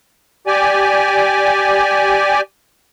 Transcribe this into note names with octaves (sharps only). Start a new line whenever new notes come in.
G4 D5 G#5